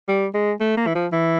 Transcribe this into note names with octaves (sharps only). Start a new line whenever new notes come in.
G3
G#3
A3
A#3
E3
F3
E3